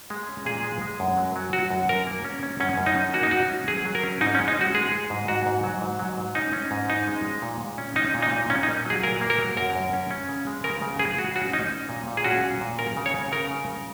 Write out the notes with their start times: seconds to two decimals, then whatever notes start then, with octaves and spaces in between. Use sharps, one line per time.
0.10 G#3
0.29 C#4
0.45 A#2 G#4
0.63 G#3
0.81 G#3
1.00 F#2
1.17 F#3
1.36 F#3
1.53 F#3 F#4
1.71 F#2
1.89 F#3 A#4
2.07 A#3
2.25 C#4
2.43 C#4
2.60 F#2 C#4
2.78 F#2
2.86 D#4
2.96 C#4
3.13 A#3 F#4
3.23 D#4
3.31 A#3 F#4
3.49 C#4
3.68 F#3 G#4
3.85 F#3
3.95 A#4
4.03 C#4
4.21 G#2 D#4
4.35 C#4
4.39 G#3
4.48 D#4
4.57 C#4 F#4
4.74 G#3 G#4
4.92 G#3
5.10 G#2
5.28 G#2 F#4
5.46 G#2
5.64 F#3
5.81 G#2
5.99 F#3
6.17 G#2
6.35 C#4 D#4
6.53 C#4
6.71 G#2
6.89 C#4 D#4
7.07 G#3
7.25 G#3
7.42 A#2
7.61 A#2
7.78 C#4
7.96 C#4 D#4
8.14 A#2
8.22 D#4
8.32 A#2
8.50 A#2 C#4
8.63 D#4
8.68 A#3
8.85 F#3 G#4
9.03 A#2 A#4
9.21 A#3
9.30 A#4
9.39 F#3
9.57 F#2 A#4
9.76 F#2
9.93 C#4
10.11 C#4
10.29 C#3
10.47 G#3
10.64 C#3 A#4
10.82 C#3
10.99 C#3 G#4
11.18 C#3 F#4
11.36 C#4 F#4
11.53 C#4 D#4
11.72 C#4
11.89 A#2
12.07 A#2
12.17 G#4
12.25 C#4 F#4
12.42 A#2
12.61 A#2
12.78 C#3 A#4
12.97 C#3
13.06 C#5
13.14 C#3
13.32 C#3 A#4
13.51 C#3
13.68 C#3